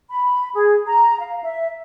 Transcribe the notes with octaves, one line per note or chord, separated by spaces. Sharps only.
B5
G#4
A#5
F5
E5